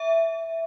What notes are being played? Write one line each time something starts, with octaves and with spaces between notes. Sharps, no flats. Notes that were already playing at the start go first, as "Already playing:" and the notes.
Already playing: E5